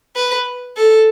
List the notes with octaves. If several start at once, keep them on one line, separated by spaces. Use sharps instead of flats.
B4
A4